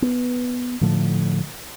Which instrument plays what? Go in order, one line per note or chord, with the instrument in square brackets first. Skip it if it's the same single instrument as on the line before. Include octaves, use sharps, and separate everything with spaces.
[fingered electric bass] B3
A2 D3 F3 A3